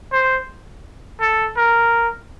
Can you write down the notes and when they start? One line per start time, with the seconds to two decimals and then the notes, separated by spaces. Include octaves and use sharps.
0.12 C5
1.21 A4
1.57 A#4